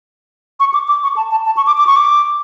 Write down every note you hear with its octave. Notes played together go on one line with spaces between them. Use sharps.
C#6
D6
D6
C#6
A5
A5
A5
C#6
D6
D6
C#6
D6